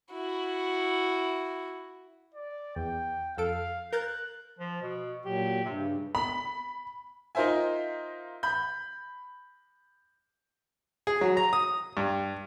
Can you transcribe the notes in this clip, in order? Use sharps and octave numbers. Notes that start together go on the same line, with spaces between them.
E4 F#4
D5
E2 G5
F2 A4 F5 D7
A#4 F#6 G6 A6
F3
B2
A#2 F#3 G4
G2 C3
C#3
B5
D#4 F4 A#4 C5 E5 G#5
B5 G6
G#4
F#3
A#5
D#6
G2